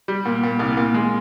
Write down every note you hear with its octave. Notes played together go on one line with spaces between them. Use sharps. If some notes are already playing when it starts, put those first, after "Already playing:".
G3
A#2
A#2
C2
A#2
G#3